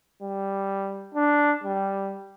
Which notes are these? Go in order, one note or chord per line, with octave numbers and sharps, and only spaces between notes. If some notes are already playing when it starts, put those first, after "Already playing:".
G3
D4
G3